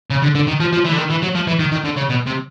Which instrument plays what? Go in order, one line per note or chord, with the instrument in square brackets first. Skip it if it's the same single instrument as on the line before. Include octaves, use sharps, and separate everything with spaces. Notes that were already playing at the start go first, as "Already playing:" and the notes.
[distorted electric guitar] C#3
D3
D3
D#3
F3
F3
E3
D3
D#3
E3
F#3
F3
E3
D#3
D#3
D3
C#3
B2
C3